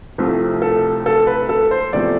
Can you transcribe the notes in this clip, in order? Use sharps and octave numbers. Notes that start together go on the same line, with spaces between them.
C2 C3 F3 A3
A4
A4
B4
A4
C5
E2 C3 F3 A3 D5